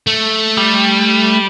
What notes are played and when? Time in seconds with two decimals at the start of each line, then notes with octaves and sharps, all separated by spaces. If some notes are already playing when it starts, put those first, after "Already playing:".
0.07 A3
0.57 G3